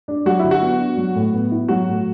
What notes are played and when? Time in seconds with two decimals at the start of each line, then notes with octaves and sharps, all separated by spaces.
0.08 D4
0.26 F#3 F#4
0.39 D3 E4
0.51 F#4
0.62 B3
0.80 D4
0.97 F#3
1.15 A2
1.34 B3
1.51 E4
1.68 F#3 F#4
1.88 A2